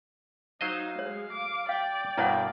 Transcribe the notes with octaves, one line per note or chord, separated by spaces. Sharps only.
F#3 D#4 C5 D#5 F5
G#3 C#5
D6
D5 F5 G5
G2 B2 A#3 E4 C#5 F#5